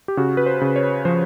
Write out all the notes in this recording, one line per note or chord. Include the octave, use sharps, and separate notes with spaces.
G4
C#3 F#4
B4
C5
C#3
C#5
F3 C5